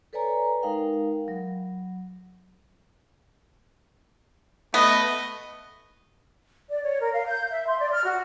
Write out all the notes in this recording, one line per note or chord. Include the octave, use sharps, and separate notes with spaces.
A4 B4 C#5 D5 G#5 A#5
G#3 D#4 A#4 F5 G5
F#3
A3 B3 D#5
D5
C#5
A#4
F5
G6
E5
C6
D5
F6
F#4